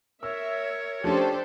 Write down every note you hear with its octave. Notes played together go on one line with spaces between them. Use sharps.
A#4 C#5 E5 E6
F3 A3 C#4 D4 G4 A4 C5